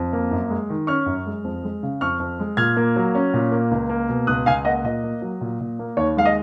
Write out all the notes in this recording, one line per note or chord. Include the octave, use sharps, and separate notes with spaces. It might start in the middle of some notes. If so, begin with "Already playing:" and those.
Already playing: F2
A#3
F#2
G#3
D#3
C#4 C#6 F6
F#2
G#3
F2
G#3
C#3
F2 C#6 F6
F2
G#3
A#2 F6 G#6
A#3
F#3
C#4
A#2
A#3
C#2
A#3
B2
C#2 D#6 F#6
C#2 F5 G#5
A#3 D#5 F#5
A#2 D#5
A#3
F#3
A#2
A#2
A#3
D#2 C#5
G#3 F5
D#5